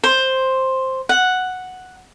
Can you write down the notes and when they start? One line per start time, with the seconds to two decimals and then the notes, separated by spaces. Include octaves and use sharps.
0.04 C5
1.09 F#5